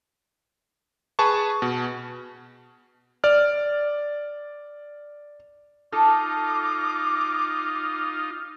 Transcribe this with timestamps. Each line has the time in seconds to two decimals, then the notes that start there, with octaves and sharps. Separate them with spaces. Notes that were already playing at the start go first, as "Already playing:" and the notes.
1.19 G#4 B4 A5 C#6
1.62 B2
3.24 D5 F6
5.93 D#4 F4 A4 D6